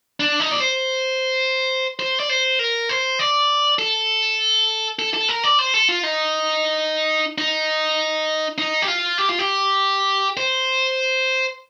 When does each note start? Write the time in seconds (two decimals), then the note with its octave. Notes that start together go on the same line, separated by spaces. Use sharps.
0.20 D4
0.40 D#4
0.51 D5
0.60 C5
1.99 C5
2.20 D5
2.29 C5
2.59 A#4
2.89 C5
3.19 D5
3.79 A4
4.99 A4
5.14 A4
5.28 A#4
5.44 D5
5.59 C5
5.74 A4
5.89 F4
6.03 D#4
7.38 D#4
8.58 D#4
8.82 G4
8.88 F4
9.18 G4
9.29 F4
9.39 G4
10.37 C5